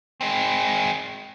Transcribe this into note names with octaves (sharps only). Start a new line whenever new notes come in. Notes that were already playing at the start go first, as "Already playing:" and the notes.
G#3 C4